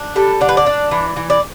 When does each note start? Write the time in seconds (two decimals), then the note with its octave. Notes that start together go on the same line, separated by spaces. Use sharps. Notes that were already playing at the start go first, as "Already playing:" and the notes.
Already playing: D4
0.15 G3 A4
0.41 D3 D5
0.49 B4
0.57 D5
0.66 D4
0.91 E3
1.16 E3
1.30 D5